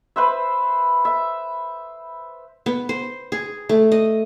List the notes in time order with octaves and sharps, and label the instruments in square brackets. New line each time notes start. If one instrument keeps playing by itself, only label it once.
[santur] B4 C5 E5
E5
[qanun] B3
C5
G#4
A3
D#5